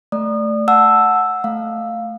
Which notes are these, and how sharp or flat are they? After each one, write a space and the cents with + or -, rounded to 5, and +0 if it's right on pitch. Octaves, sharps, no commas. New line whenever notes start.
A3 +0 D5 +0 D#6 -30
F#5 -15 A5 +0 E6 +0
A3 -5 F5 +0